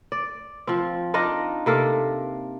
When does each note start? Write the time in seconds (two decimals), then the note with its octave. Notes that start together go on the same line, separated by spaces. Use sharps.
0.12 D5
0.67 F3 C4
1.14 D4 D#4 F4 D#5
1.66 C3 A#3 A4 F5